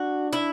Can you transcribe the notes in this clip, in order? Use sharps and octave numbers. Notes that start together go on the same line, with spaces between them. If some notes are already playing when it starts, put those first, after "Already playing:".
Already playing: D4 F#4
E4